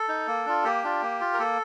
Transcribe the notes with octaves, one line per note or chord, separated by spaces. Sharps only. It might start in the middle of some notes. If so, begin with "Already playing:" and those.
Already playing: A4
D#4
A#3
D4 F4
A#3 G4
D4 F4
A#3
F4
A#4
A#3 A4